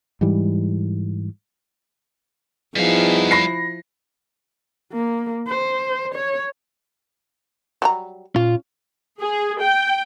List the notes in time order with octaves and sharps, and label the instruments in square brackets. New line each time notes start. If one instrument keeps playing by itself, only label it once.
[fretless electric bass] G#2 E3 G3
[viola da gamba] F3 E4 [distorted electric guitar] G3 F5 [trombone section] B3 D#4 G#4
[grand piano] B5 A#6 C7
[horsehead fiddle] A#3
C5
C#5
[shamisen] F#3 G3 A#5
[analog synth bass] A#2 [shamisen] C#4 [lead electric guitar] F4
[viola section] G#4
G5